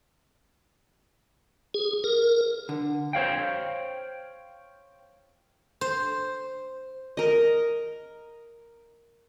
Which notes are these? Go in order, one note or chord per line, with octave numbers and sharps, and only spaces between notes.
G#4
A#4
D3
C5 C#5 F5 G5
C5
A#4 D#5